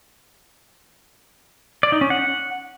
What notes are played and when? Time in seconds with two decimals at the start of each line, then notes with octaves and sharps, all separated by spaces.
1.83 D5
1.92 D#4
2.01 C#4
2.10 F#5